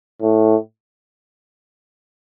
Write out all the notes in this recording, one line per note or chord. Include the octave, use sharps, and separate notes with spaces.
A2